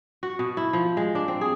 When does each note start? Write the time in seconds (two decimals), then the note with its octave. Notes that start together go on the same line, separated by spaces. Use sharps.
0.23 F#4
0.39 B2
0.57 E4
0.73 F3
0.97 G#3
1.15 D4
1.28 C4
1.41 G#4